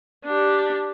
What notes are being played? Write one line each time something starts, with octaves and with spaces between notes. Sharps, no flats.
D4 G4